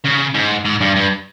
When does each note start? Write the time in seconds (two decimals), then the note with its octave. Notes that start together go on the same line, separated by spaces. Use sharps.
0.05 C#3
0.34 G#2
0.65 G#2
0.81 G2
0.96 G2